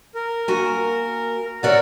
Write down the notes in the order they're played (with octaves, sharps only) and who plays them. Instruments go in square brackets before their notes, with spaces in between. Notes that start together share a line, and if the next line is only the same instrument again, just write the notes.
[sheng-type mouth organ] A#4
[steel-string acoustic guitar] A#3 F#4 G#5
[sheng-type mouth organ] A#4 F#5 [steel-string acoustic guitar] C#5 D5 E5